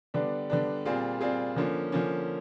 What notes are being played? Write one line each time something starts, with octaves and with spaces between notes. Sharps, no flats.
D3 G3 B3 D4
D3 G3 B3 D4
A#2 G3 C4 F4 G#4
A#2 G3 C4 F4 G#4
D3 F3 A#3 C#4
D3 F3 A#3 C#4